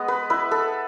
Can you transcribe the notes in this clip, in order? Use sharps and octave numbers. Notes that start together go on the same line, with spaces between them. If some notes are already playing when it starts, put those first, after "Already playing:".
Already playing: G#3 B3 D#5
B4
E4 B4
A4